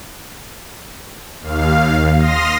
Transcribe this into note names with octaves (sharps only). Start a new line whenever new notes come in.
D#2 F5
C6 D#6 F6 A#6